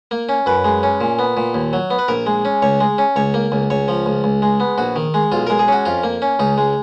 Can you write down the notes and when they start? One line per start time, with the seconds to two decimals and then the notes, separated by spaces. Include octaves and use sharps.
0.11 A#3
0.29 C#4
0.46 F#2 B4
0.64 G#3
0.83 C#4
1.00 A#2
1.19 B3
1.37 A#2
1.54 D#2
1.73 F#3
1.91 B3
1.99 B4
2.08 A#1 A#4
2.27 G#3
2.45 C#4
2.62 C#2 C#5
2.80 G#3
2.98 C#4
3.16 C#2 C#5
3.34 A#3
3.52 C#2
3.70 C#2 C#5
3.88 F3
4.06 C#2
4.24 C#2
4.42 G#3
4.60 B3
4.78 A#1 F#4
4.96 D#3
5.14 G#3
5.32 B1 F4
5.47 G#3 A#4
5.59 G#4
5.68 C#4 F#4
5.85 F2 F4
6.03 A#3
6.22 C#4
6.39 C#2 D#4
6.58 G#3